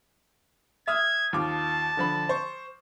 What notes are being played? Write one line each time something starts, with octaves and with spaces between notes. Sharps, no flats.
E5 D#6 F6 G#6
D#2 F4 A5 D6
D3 F3 B5
C5 C#6